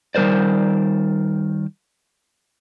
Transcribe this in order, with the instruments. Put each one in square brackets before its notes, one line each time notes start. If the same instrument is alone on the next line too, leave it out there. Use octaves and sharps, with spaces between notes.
[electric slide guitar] D#3 G3 A#4 C5 D5